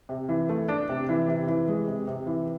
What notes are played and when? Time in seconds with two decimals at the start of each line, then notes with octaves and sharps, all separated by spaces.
0.09 C3
0.29 E3
0.49 A3
0.68 D4
0.89 C3
1.09 E3
1.28 C3
1.47 E3
1.68 G#3
1.87 C3
2.07 C3
2.27 E3